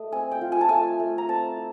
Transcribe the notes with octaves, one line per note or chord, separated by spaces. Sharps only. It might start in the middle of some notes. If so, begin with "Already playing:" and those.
Already playing: A3 D#5
C4 G#5
G5
F4
G#5
A5
A3 G#5
A3
A#5
C4 A5
E4